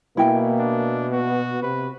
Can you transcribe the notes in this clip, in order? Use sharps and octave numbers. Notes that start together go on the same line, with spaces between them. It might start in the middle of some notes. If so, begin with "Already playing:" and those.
B2 A#3 E4 G5 G#5
D4
B3 F#4
C3 B4